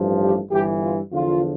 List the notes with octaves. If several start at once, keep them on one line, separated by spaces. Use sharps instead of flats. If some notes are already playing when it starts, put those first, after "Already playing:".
Already playing: A1 G2 F3
G4
G1 G2 E3 G4
F4
E2 D3 F3 F4